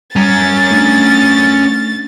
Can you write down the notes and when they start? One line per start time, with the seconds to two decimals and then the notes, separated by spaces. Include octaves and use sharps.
0.16 G3 C#4 A#4 A6
0.71 A3 D4